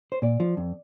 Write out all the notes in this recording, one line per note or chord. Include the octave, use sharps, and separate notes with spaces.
C5
A#2 D5
F3
F2